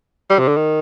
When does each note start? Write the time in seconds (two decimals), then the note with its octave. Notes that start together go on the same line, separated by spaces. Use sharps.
0.30 G3
0.39 C3
0.48 D3
0.57 D#3